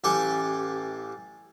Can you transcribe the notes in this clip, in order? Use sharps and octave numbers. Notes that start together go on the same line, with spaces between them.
A1 G4 A4 G#5